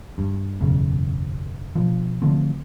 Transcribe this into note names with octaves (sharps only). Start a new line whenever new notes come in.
G2
F#1 B1 E2 C#3
B2 F3
D3 F3 A3 C4